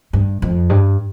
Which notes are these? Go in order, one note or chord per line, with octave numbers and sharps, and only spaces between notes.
G2
F2
G2